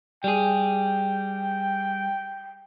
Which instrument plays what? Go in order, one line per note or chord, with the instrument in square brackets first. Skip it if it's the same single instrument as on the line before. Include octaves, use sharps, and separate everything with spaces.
[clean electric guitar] G3 G#4 [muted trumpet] G5